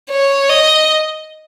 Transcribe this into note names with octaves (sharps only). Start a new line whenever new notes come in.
C#5
D#5